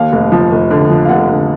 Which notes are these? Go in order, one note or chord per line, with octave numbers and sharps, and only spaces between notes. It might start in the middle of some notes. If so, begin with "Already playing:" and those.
Already playing: D#2 F5
F1
F3
F1
D3
F3
F5
F1 F#5
D3